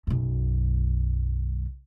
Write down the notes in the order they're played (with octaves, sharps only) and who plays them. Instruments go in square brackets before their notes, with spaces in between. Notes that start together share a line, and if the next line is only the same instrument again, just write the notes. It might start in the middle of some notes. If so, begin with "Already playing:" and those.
[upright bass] B1 F#2